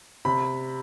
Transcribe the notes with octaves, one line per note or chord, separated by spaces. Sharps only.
C3 B5